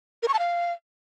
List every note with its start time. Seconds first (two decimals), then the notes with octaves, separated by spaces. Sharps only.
0.23 A#4
0.28 C#6
0.34 A5
0.39 F5